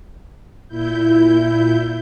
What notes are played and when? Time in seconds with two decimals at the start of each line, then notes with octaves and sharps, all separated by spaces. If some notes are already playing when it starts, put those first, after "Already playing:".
0.68 A#2 E4 G6